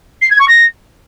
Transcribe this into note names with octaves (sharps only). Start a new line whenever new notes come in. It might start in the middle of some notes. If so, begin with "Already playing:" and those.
C7
G#6
C#6
A#6